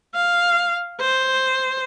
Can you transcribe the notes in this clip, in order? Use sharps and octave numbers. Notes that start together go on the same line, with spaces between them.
F5
C5